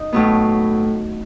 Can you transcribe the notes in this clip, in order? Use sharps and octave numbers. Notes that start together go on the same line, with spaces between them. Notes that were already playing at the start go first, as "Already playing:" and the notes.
Already playing: D#4
A2 F#3 B3